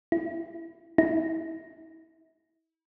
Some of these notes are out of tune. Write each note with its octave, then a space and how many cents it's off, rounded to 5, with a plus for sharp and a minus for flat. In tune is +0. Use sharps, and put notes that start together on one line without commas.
E4 +10
E4 -30